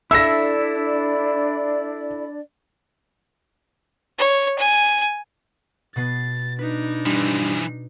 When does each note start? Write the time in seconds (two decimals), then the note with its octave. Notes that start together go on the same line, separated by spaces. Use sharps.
0.11 D4 E4 A4 D5 E5 E6 A#6
4.18 C#5
4.58 G#5
5.96 B2 B3 A6 C7
6.59 D4 D#4 B4
7.06 G2 E3 F3